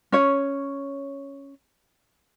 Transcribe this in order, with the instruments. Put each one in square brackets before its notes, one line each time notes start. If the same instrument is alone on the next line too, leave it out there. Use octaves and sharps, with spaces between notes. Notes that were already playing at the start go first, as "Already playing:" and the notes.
[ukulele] C#4 C#5